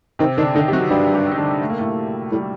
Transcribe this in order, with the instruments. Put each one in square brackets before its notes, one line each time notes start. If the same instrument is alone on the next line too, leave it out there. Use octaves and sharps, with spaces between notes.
[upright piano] C3 C4 [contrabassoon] D#3
[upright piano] D3 D4 [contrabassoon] D#3
[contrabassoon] D3 [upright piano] D#3 D#4
[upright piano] G4
[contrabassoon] C3 [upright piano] F#3 F#4
[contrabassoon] G2 [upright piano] G3 G4
[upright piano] G3 G4
D#4
D3 D4
A3
A#3
A2 A3
[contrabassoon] A2 [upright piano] G3